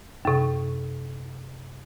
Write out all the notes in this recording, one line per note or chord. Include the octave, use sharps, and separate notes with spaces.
F#2 C3